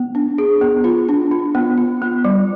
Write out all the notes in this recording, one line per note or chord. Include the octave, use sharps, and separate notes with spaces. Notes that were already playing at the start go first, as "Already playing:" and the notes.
Already playing: B3
D4
G#4
B3
F4
D4
F4
B3
F4
B3
G3